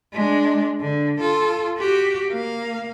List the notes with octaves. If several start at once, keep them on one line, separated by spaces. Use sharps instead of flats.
G#3 D4
D3
F4 A4
F#4 G4
A#3 F5